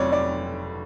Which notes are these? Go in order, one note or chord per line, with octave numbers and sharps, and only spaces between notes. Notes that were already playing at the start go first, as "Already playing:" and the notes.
Already playing: F1 F2 F#3 C#5 D5
D5